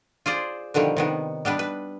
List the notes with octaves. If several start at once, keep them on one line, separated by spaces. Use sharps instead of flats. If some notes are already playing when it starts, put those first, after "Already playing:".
F4 G#4 C5 D5
B2 D3 D#3 F3 G3
C3 D#3 B3
G3 B3 D4 B4
B4